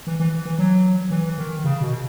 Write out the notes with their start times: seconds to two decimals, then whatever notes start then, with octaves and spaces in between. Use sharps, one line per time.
0.07 E3
0.20 E3
0.45 E3
0.59 F#3
1.11 E3
1.38 D#3
1.64 C#3
1.81 B2